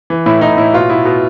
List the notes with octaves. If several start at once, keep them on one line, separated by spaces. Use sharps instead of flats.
E3
A2 E4
A2 D#4
A2 E4
B2 F4
B2 E4
B2